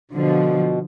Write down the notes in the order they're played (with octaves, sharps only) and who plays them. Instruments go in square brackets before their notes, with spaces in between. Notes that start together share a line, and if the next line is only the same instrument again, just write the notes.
[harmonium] B2 [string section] D3 F3